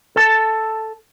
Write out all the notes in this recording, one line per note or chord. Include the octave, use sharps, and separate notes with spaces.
A4 A5